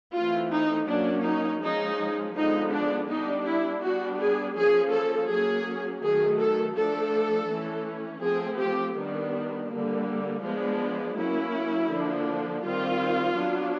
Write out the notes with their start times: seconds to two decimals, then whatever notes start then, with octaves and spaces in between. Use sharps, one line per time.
0.15 E3 A3 C4 F4
0.52 D#4
0.88 F#3 A#3 C#4 D4
1.25 D#4
1.62 F3 G#3 C#4 D#4
2.35 D3 F3 G#3 B3 D#4
2.72 D4
3.08 G3 B3 D4 D#4
3.45 E4
3.82 G3 B3 D4 F#4
4.19 G#4
4.55 F3 A#3 C#4 G#4
4.92 A4
5.29 F#3 A#3 C#4 G#4
6.02 D#3 F#3 A3 G#4
6.38 A4
6.76 F3 A3 D4 A4
7.49 E3 A3 C#4
8.22 F3 A3 C4 G#4
8.58 G4
8.95 D#3 G3 B3 D4
9.69 D3 G3 A#3
10.42 F3 G#3 B3 D4
11.15 F#3 A#3 C#4 E4
11.89 D3 F3 A#3 D4
12.63 D#3 G3 C4 F4
13.36 F#3 B3 D4